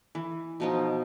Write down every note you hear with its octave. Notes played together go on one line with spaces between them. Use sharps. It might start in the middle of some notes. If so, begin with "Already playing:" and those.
E3
B2 F3 D#4